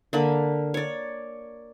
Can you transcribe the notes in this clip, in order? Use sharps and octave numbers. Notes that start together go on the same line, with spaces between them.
D3 A#3 B5
C#5 D5